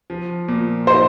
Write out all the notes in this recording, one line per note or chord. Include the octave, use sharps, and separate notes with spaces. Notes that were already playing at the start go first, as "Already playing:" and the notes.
F3
A#2
D#4 C5